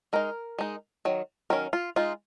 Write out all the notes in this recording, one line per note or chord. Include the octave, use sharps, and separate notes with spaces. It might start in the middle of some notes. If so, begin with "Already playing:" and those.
G#3 D#4 A#4
G#3 D#4
D#3 F#3
D#3 F#3 C#4 A#4
F4
G#3 D#4 F4